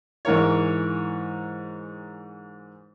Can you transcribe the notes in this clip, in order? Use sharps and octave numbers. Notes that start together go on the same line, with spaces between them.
G#2 E3 A#4 C#5